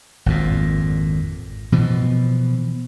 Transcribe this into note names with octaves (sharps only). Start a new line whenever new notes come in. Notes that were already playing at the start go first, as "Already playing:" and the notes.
G#1 F2 A#2
B2 E3 F3